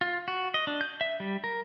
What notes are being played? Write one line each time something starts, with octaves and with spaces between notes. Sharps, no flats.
F4
F#4
D#5
D4
G6
E5
G3
A#4